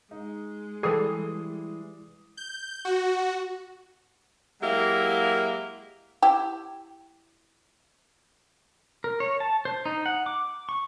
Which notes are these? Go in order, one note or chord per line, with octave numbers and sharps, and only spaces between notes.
G#3 D#4
E3 G3 G#4 A4 D5 D#6 C7
G6
F#4
F#3 G#3 A#3 E4 G4
E4 G4
A#4
C#5
A5
C5
D#4
F#5
D6
C#6